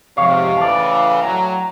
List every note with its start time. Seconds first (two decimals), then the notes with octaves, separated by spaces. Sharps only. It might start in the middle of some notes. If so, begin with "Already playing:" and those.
0.17 F2 G#2 C3 C#5 F5
0.57 A2 C#3 E3 A4 D5
1.23 A2 F#3 A#5